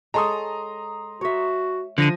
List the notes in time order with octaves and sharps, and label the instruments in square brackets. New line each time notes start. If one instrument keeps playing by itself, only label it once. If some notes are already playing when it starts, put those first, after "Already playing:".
[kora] G#3 A4 C#5 [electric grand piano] A#5 C6 D#6
[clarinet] F#4 [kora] C#5 E5
[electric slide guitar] D3 [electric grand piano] F3 A#6 D#7